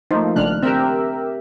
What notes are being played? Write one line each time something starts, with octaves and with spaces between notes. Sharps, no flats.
F3 A3 A#3 D#4 C5
G#1 C#3 A3 D4 F6 F#6
C4 G4 A#4 E5